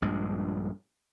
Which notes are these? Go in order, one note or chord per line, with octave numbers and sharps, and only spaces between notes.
A#1 G2 G#3